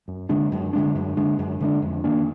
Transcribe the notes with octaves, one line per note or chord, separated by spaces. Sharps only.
F#2
D3 G#3 D4
F#2
D3 G#3 D4
F#2
D3 G#3 D4
F#2
D3 G#3 D4
F2
D#3 A#3 D4